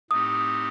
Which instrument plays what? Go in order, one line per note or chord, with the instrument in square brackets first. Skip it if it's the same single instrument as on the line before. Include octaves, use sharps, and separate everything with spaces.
[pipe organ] A2 A3 C4 D#4 G4 [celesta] D#6